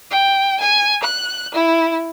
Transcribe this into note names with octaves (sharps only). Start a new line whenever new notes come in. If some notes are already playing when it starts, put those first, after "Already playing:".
G5
G#5
F#6
E4